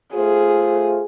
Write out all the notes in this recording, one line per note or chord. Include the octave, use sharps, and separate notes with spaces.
A3 F4 G#4 C5